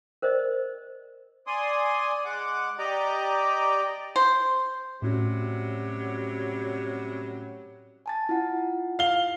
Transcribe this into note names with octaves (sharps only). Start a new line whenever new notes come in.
A#4 C5 D5 D#5
D5 G#5 C6 D#6
G#3 F#5 D6
G4 D5 D#5 G5 A#5 D6
C5
A2 C3 F#3 G3 C#4 F#4
G#5 A5 A6
E4 F4 F#5
F5 G7